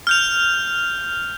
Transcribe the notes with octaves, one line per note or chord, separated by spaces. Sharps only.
F6 G6 F7